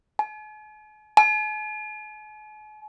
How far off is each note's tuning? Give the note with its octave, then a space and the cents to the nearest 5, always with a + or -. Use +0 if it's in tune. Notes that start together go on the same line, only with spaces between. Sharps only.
G#5 +45
G#5 +45